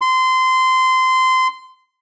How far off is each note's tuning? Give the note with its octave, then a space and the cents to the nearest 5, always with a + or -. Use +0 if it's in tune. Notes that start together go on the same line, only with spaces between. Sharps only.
C6 -20